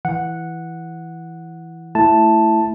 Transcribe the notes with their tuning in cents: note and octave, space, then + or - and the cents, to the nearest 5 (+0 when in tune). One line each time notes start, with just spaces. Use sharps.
E3 +0 F#5 -5
A3 +0 E4 +0 A5 +0